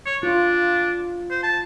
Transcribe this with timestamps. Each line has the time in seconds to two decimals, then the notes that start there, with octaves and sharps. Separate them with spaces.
0.06 C#5
0.23 D4 F4
1.31 C5
1.43 A5